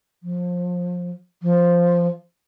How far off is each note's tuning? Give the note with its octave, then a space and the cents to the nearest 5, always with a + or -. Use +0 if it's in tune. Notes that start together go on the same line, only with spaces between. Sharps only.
F3 +25
F3 +0